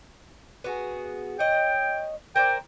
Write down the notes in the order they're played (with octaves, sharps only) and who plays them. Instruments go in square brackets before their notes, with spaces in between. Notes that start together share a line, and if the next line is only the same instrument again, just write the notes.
[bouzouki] B3 F#4 G#4
[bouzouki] C#5 D#5 [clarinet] G5
[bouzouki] A#4 C5 D5 [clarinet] G5